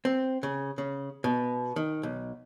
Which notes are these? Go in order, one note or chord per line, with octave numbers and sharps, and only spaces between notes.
C4
C#3
C#3
B2
D#3
B1